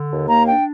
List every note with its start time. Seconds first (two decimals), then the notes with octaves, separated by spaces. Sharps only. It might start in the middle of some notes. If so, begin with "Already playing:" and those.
Already playing: D3
0.10 D#2
0.29 A#3 A#5
0.48 D4 G5